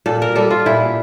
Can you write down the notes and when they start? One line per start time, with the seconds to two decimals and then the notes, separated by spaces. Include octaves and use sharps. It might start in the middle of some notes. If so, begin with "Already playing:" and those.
0.06 A#2 A4
0.22 A#4
0.36 G3 A4
0.51 F4
0.66 A#2 E4